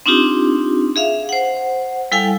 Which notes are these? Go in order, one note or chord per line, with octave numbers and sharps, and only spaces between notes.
C4 D4 D#4 F4 G4
G#4 E5 F5
C5 F#5
G3 E4 A4 F5 G5 G#5